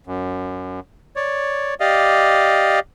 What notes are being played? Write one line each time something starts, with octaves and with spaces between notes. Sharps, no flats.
F#2
C#5 D5
G4 D5 D#5 F5